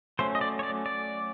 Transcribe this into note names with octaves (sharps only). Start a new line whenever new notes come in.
F#3 A3 C#4 C5
D#5
D5
C#5
D5
D5